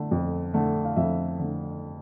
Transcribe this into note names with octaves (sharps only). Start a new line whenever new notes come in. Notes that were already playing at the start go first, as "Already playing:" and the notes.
Already playing: D3 A3
F2
D3 A3
F5
F2 E5
D3 A3